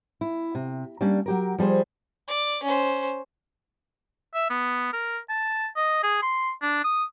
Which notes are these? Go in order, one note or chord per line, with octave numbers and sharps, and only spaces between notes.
E4
C3
G3 A#3 C#4 D4
F#3 G4 A#4
F3 G3 G#4 C5
D5
C#4 C5
E5
B3
A#4
A5
D#5
G#4
C6
D4
D#6